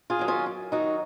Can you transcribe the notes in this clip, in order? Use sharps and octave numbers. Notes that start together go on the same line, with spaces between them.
F4 G#4
D#3 F#3
C#4 F4
F#2
D#3 F#3 D#4 F#4